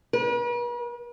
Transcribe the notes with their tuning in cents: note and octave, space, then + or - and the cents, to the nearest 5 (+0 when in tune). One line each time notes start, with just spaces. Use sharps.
B4 -45